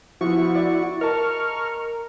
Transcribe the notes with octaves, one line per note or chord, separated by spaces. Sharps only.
F3 B3 E4 F#4 C#6
D5 E5
A#4 D#5 A5 C#6 F6